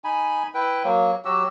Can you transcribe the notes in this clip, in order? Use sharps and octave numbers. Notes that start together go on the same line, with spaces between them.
D#4 G#5 B5
E4 B4 G5
F#3 A#3
F#3 F#4 G4 E6